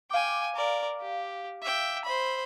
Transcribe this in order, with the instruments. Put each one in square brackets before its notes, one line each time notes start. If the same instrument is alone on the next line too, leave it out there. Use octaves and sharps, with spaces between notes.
[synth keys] F5 D6 [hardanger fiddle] G5 G#5
[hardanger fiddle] A#4 D5
G4
E5 G5
C5 B5